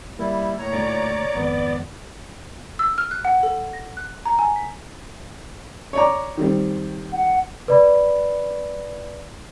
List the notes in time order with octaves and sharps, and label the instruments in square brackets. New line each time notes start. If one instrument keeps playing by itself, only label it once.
[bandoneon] G3 E4 [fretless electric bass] A#3
[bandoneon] A2 [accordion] C#5 A#5
[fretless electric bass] D2 A#2 A3 [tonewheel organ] D5
[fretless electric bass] G#1 F2 [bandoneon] B3
[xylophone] E6
F6
F#6
F#5
A4
A#6
F#6
A#5
G#5
B6
[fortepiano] C#5 D5 A#5
D#3 G3 C4
[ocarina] F#5
[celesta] B4 D5 B5